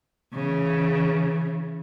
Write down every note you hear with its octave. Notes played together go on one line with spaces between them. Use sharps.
C#3 E3